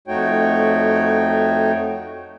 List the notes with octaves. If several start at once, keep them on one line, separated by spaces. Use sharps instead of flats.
F2 A3 D#4 F#4 C#5 G5